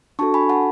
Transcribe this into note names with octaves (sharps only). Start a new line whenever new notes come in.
D4 F#4 A4 A5 C#6
G#5 B5
F#5 A5